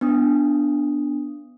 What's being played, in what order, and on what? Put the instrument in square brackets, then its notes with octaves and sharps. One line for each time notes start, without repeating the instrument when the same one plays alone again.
[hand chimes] B3 D4 D#6